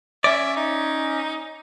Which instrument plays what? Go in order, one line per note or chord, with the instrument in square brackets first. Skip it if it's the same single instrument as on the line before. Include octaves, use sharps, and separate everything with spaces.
[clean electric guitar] C#4 D5 [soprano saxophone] E5
[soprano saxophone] D#4